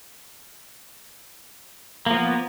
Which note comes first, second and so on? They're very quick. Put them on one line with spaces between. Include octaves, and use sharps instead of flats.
A#3 F3 B3